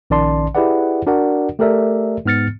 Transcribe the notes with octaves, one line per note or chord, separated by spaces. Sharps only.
A#1 D#3 C#4 D5 A5 C6
E4 G4 G#4 B4 D5 F#5
D4 F#4 A#4 D5 F#5
A3 G4 A4 A#4 D5 E5
G#2 B3 F6 A6 C#7